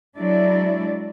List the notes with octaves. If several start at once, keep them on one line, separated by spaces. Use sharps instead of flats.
F#3 G#3 D4 E4 D5